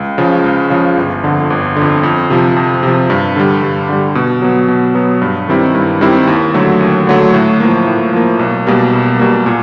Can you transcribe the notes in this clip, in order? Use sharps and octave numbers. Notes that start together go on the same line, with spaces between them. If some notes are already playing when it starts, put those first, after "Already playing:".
Already playing: C#2
C#3 F3
C#2
C#3 F3
G1
F2 D3
G1
F2 D3
F2
C3 F3
F2
C3 F3
G2
D3 G3
G2
D3 G3
B2
F#3 B3
B2
F#3 B3
G2
D#3 G3 C4 E4
G2
D#3 G3 C4 E4
D#2
D3 F#3 A3
D#2
D3 F#3 A3
A2
F3 A#3
A2
F3 A#3
B1
B2 G3 A#3
B1
B2 G3 A#3
A#2